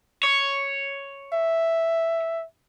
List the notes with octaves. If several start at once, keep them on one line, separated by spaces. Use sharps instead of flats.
C#5
E5